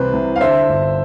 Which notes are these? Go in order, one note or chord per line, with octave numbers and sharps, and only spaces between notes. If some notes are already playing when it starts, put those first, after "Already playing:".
Already playing: C2 C3 E3 B4 C5
C2
F5
D3 C5 E5
G1